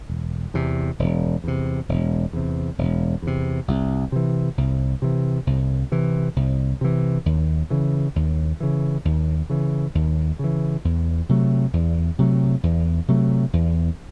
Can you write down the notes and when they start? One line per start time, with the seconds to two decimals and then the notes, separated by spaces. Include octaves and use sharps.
0.09 E1
0.54 E2 C3
0.99 E1
1.44 E2 C3
1.89 E1
2.33 E2 C3
2.78 E1
3.22 E2 C3
3.68 C2
4.12 C3 E3
4.58 C2
5.02 C3 E3
5.47 C2
5.92 C3 E3
6.36 C2
6.81 C3 E3
7.26 D#2
7.70 C#3 E3
8.16 D#2
8.60 C#3 E3
9.05 D#2
9.50 C#3 E3
9.95 D#2
10.39 C#3 E3
10.84 E2
11.29 C3 F#3 A3
11.73 E2
12.18 C3 F#3 A3
12.63 E2
13.08 C3 F#3 A3
13.53 E2